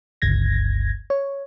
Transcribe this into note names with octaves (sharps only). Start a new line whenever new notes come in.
G1 C#2 G#6 A#6
C#5